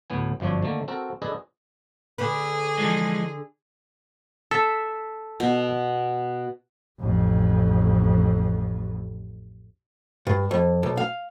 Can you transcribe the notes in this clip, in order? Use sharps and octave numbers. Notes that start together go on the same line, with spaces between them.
D2 A2 B3 G#5
G1 F#2 F3 D4 C#5
D3 D#3 A3 A#3
C4 F#4 A4 A#4
D4 G#4 A4 B4 D#5
D3 G#4 B4
E3 F3 G#3
A4 E5
B2
A1 F2
G2
F2
B1
F5